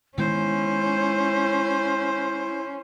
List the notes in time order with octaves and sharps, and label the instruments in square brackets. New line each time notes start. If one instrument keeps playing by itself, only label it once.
[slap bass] D#3 G#3 B3 [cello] C#4 [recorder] E4 [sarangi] C5